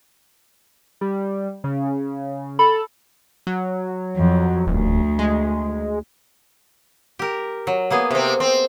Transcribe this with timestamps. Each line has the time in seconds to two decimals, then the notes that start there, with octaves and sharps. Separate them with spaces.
1.01 G3
1.64 C#3
2.59 A4 B5
3.47 F#3
4.15 F2
4.67 D#1 D2
5.19 G#3
7.19 G4 A#4
7.67 F#3
7.90 A#3 B3 G#4
8.11 C3 C4
8.40 C4